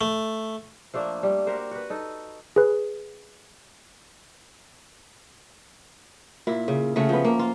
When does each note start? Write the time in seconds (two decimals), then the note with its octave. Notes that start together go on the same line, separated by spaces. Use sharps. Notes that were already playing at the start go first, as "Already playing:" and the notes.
0.01 A3
0.94 F3 A3 A#3 D4
1.23 G3
1.47 F#4 G4 A#4 C5
1.71 F#4 B4
1.90 D#4 A4
2.56 G#4 B4
6.47 A#2 E4
6.68 C#3
6.96 C#3 A3 C#4 F#4
7.09 F3 B3
7.25 A#3
7.39 F4